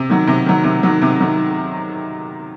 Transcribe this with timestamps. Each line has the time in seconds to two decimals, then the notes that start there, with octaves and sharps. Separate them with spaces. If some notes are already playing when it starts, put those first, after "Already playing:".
Already playing: C3
0.09 D#3 F#3
0.27 C3
0.46 D#3 F#3
0.64 C3
0.83 D#3 F#3
1.02 C3
1.20 D#3 F#3